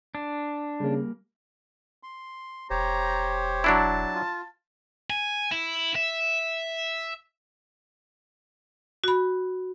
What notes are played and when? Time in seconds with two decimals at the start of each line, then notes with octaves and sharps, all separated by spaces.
0.15 D4
0.80 C#3 G3 A#3
2.03 C6
2.70 E1 G4 C5 C#5 A#5
3.64 F#3 D4 E4 A5
4.15 F4
5.10 G#5
5.52 E4
5.95 E5
9.04 F#4 B5